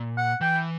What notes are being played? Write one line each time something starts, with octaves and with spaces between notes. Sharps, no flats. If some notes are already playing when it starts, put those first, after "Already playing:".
Already playing: A#2
F#5
E3 G5